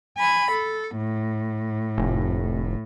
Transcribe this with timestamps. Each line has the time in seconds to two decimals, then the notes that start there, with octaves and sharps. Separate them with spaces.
0.18 G#5 B5
0.51 A4
0.98 A2
1.98 F1